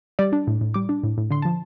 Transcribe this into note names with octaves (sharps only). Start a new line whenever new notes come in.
G3 D5
D4
A2
A2
G3 D6
D4
A2
A2
D3 C6
F3 A5